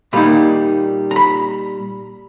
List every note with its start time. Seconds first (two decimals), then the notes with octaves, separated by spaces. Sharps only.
0.13 A#2 G3 A#3 D#4 B5
1.11 A#5
1.16 B5